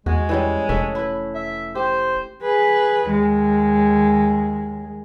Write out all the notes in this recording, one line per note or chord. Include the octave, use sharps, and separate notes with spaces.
E2 G#3 F#4
E3 G3 C#4
F1 A3 C#4 E5
E4 B4
E5
G4 C5
G#4 B4
D#2 G#3